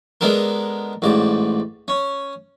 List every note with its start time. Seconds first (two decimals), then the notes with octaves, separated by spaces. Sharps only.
0.21 G#3 B3 D4 A4 A#4
1.02 A1 G#2 D5
1.88 C#4